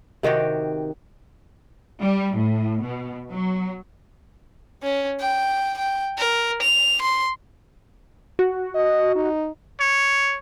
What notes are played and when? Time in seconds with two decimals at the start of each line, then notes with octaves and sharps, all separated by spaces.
0.23 C3 D#3 F#4 G4
2.01 G3
2.37 A2
2.83 B2
3.31 F#3
4.83 C#4
5.20 G5
5.79 G5
6.18 A#4
6.62 F7
7.02 C6
8.39 F#4
8.75 D#5
9.16 D#4
9.80 C#5